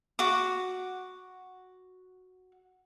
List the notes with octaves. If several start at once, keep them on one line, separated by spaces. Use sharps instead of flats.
F#4 D6